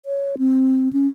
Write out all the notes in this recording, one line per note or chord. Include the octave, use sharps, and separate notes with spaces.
C#5
C4
C#4